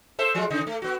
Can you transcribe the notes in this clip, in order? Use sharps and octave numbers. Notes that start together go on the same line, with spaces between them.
A4 C5 E5
F3 G#3 F4
C#3 D#4
A3
B3 F#4